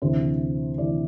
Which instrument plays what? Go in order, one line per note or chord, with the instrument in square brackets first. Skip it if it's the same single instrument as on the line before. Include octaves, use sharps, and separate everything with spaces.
[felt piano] D2 C3 E3 C5
D2 C3 E3 D5